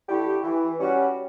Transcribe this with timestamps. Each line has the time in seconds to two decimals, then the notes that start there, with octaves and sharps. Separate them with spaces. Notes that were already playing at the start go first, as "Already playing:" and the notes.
0.08 D3 A3 E4 G4
0.44 E3
0.79 G3 C#4 F#4